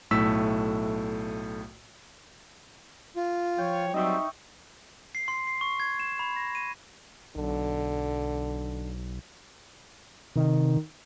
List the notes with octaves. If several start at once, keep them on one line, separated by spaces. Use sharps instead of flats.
B1 A2 A3 E6 B6
F4
F3 C#5 G5
F#3 G3 C4 D#4 D#5 E5 C#6
C7
C6
C7
C#6
G#6
E7
B5
A#6
D#7
B1 D3
C3 D#3